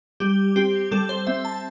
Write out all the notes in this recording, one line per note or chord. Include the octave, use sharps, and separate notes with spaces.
G3 G4
C4 G4
G3 A4
C5
C4 E5
A5